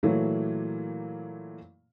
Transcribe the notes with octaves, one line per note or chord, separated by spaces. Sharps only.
A#2 E3 F#3 A3 A#3